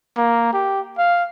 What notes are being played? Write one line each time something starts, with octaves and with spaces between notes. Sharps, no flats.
A#3
G4
F5